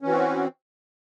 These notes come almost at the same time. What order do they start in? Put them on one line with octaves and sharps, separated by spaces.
C#4 E3 F#4 C4